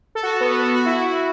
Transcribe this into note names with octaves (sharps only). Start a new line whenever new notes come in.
A4
F#4
B3
F#4
A4
F#4
E4
E4
F#4